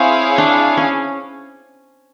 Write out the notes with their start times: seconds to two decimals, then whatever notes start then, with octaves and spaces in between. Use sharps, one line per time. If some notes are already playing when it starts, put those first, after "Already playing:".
Already playing: C4 E4 G#4 C#5 F5
0.38 D4
0.77 C#4